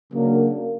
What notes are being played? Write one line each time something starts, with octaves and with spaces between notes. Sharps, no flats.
C#3 F#3 A#3 D4